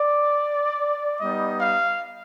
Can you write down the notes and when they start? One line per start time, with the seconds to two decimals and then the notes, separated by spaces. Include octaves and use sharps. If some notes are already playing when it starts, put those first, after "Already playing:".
Already playing: D5
1.20 G3 B3 D#4 D#5
1.61 F5